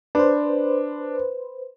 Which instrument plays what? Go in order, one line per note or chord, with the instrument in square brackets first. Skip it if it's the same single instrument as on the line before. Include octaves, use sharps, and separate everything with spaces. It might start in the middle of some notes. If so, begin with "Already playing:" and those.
[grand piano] D4 [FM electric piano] B4 C5